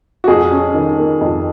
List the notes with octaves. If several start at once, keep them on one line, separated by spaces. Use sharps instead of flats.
F#4
F2 G#4
C#4
D#3
A#3
F2